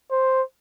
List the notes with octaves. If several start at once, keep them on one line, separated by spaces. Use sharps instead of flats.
C5